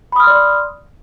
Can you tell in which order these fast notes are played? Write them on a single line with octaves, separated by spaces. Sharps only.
B5 D#6 F6 C6 D5